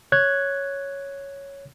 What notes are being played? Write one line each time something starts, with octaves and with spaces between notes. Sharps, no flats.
C#5 F#6 G#6